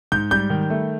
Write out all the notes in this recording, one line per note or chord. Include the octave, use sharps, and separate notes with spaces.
G#2 G6
G3 G6
D#3
A3